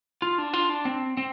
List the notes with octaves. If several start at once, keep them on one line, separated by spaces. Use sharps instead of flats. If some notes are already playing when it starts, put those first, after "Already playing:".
F4
D4
F4
D4
C4
C4